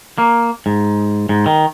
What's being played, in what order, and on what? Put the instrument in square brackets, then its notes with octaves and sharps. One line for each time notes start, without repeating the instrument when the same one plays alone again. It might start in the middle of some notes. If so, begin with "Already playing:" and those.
[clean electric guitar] A#3
G#2
G#2
D#3